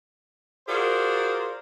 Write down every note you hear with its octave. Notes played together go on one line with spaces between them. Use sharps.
F4 F#4 G#4 A#4 C5 D5